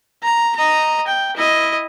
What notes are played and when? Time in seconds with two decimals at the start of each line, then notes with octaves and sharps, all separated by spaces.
0.23 A#5
0.55 D#5 A#5
1.07 G5
1.37 E4 D#5